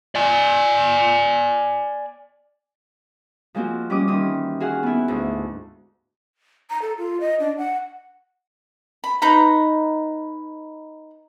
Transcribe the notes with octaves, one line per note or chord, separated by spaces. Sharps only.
D5 G#5
F3 G#3 A#3 C4 F4 F#4
G3 C#4 D#5 D6 D#6
D#3 E3 C4 C#4 D#6
F#4 G#4 F5 F#5
B3 E4
D2 G#2
A#5
A4
F4
D#5
D4
F#5
B5
D#4 B4 A#5 B5